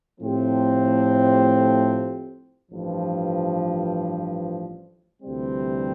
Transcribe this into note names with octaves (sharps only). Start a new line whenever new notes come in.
A2 F3 A3 C4 G4
A1 G2 F3
D2 C3 E3 G3 C4